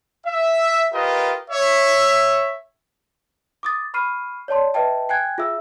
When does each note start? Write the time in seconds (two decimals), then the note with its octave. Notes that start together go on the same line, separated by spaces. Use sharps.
0.27 E5
0.94 F4 G4 A#4 B4 D#5
1.51 C#5 E5
3.63 D6 D#6 A6
3.94 B5 C#6 F6 C7 D#7
4.48 C#5 D5 A5 C6
4.74 B4 D#5 E5 G5 A5
5.09 G5 G#5 F#6 G#6
5.38 F4 G#4 E5 E6